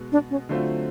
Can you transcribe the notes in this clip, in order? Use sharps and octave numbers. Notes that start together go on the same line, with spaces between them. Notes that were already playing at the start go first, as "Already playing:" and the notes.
Already playing: B2 G#3 B3
D4
C#4
D3 F#3 A3 C4 F4